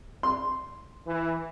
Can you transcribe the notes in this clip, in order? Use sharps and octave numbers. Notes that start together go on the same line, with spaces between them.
C6
E3